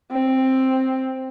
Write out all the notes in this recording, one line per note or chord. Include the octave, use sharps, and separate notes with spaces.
C4